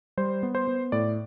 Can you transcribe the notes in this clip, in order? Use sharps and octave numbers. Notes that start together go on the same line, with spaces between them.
G3 C5
B3
C5
B3
A2 D5